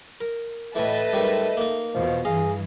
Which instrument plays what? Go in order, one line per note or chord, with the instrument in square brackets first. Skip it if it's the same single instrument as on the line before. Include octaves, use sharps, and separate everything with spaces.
[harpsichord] A#4
[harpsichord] A2 E3 [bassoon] A3 [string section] B4 D#5 A5
[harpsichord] G#2 D#3 G3
A#3 D#4
[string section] E2 B2 [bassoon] F3
[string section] G2 E3 [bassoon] G#4 [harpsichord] D#5 F5